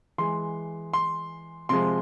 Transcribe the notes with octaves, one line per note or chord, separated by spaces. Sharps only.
E3 G#3 C6
C6
C3 F3 G#3 C6